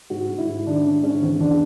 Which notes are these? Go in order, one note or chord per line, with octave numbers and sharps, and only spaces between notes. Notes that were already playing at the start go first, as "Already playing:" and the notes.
G#2 F#4
G#2
E4
G#2
D#3 D4
D#3 C#4
G#2 C#4
E3 C4
E2 D4